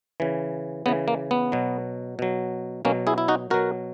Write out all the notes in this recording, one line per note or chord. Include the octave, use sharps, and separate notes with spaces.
C#3 E3
C#3 E3 B3
A#3
B3
B2 F#3
B2 F#3
B2 F#3 A#3 C#4
E4 G#4
E4
D#4 F#4
B2 F#3 F#4 A#4